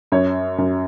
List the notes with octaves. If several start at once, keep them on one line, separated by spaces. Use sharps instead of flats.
F#2 C#5
F#2